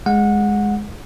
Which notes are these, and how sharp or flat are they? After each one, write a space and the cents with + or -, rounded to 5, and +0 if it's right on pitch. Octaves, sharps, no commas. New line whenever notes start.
G#3 +0 F#5 -20